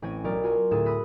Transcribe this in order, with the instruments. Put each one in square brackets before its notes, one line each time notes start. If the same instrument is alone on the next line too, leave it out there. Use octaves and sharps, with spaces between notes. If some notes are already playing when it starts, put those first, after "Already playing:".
[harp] A1 C4 C#4 G#5
B1 A#4 D5
F4 F#4 G#5 A#5 C6
D2 A2 G#4 A4 E7
B5 D#6 E6 F#6 A#6 B6